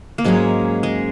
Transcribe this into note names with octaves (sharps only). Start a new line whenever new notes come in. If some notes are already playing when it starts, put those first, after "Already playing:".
A#3
G#2 F#3 G#3 C#4 G#4
G#3